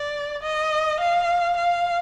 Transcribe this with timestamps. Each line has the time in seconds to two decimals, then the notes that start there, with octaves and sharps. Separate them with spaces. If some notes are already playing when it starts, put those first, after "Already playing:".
Already playing: D5
0.42 D#5
1.00 F5
1.57 F5